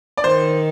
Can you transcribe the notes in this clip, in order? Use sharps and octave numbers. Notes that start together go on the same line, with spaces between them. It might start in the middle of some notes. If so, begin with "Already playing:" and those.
D5
D#3 C5